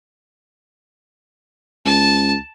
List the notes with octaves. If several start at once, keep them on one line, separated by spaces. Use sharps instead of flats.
C#2 A5